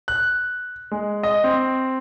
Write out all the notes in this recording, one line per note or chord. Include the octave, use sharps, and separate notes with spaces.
F#6
G#3
D#5
C4